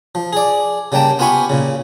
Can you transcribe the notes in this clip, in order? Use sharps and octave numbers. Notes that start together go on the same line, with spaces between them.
F3
G#4 D5
C#3 G3 A#3 G5 A5
B3 F4 G4 G#5 B5 C#6
A#2 C#3